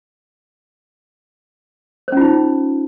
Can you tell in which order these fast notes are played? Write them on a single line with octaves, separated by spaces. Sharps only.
C5 C#4 F4 D#4